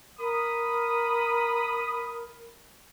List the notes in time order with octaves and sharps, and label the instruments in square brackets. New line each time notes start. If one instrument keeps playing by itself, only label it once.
[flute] A#4 [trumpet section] B5 D#6